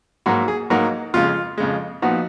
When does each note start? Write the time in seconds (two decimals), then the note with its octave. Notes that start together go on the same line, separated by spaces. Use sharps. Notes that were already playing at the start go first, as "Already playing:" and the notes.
0.26 G#2 F#3 A#3 D#4 F#4
0.48 G#4
0.70 G#2 F#3 A#3 D#4 F#4
1.14 F2 C#3 G#3 F4
1.58 F2 C#3 G#3
2.02 A#2 F3 B3 D#4 F#4